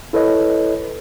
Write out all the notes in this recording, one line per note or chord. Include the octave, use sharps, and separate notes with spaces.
E4 A4 B4 C#5 D#5